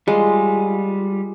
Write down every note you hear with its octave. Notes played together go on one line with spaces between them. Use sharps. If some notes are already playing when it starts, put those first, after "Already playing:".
G3 G#3 F4